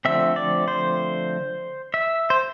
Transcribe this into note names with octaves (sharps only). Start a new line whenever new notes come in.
D3 F3 A3 C4 E5
D5
C5
E5
C5